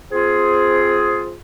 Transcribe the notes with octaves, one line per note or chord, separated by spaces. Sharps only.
C4 F4 G#4